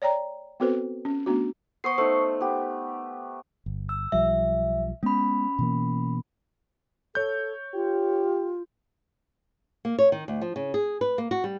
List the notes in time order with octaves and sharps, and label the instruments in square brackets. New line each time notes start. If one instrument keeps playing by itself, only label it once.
[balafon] C#5 D5 G5 A#5
B3 C4 F#4 A4 B4 C5
C#4
A3 B3 D4 F#4
[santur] B3 C5 [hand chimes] C#6 D#6 C7
[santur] A3 [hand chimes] D#4 C5
[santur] B3 G4
[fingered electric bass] G1
[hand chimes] E6
[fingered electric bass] B1 F3 G3 [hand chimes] E5
[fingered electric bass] G#3 B3 [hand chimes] C#4 B5
[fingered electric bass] B2 E3 A#3
[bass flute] A4 [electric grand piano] C#5 G6
[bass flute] F4 [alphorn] G4
[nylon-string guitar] A#3
C#5
D#3
D2
F3
C#3
G#4
B4
A#3
F#4
G3